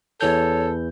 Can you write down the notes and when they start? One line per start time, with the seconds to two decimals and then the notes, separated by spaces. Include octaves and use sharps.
0.21 E2 E3 A4 C#5 G6